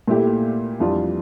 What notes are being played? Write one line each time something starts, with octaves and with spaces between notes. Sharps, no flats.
A#2 A3 E4 G4
F2 E3 G3 D4 F4